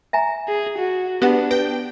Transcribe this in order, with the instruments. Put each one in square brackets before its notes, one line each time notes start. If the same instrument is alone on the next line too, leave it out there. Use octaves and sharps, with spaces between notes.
[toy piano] E5 G#5 A#5
[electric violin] G#4
F#4
[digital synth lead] B3 [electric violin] D4 [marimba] G4 B4 F#5
[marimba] B4 [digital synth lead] G5